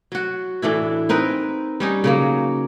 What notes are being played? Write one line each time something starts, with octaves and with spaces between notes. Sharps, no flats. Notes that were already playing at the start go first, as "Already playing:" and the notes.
F#3 F#4
A2 E3 D4 E4
C4 D#4 A#4 B4
G3 C#4 D#4
C#3 F#3 A#3